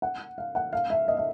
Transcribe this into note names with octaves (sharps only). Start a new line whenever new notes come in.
F#5
F5
F#5
F5
E5
D#5
E5